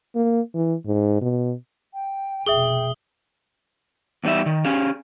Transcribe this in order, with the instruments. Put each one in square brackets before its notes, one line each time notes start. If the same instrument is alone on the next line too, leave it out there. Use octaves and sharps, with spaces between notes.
[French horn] A#3
E3
G#2
B2
[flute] G5
[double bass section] F1 B2 [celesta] G#4 E5 [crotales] D#6 G7
[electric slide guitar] E2 E3 G3 D#4 E5
D#3
C#4 G4 G#4 F5